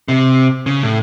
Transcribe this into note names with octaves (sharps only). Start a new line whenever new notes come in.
C3
C#3
A2